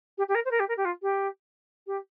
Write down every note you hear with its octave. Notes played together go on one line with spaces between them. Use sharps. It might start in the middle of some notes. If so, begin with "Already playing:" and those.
G4
G4
A#4
C5
A#4
G4
A#4
G4
F4
G4
G4